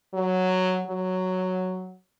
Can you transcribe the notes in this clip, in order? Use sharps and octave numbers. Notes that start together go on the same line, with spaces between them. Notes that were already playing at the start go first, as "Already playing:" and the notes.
F#3
F#3